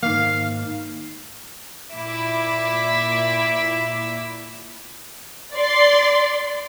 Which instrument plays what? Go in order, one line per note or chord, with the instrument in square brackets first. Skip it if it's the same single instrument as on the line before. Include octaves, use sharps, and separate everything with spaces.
[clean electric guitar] G#2 D#3 A#3 [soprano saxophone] F5
[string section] A#2 E4 D6 [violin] E5
[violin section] D5 C6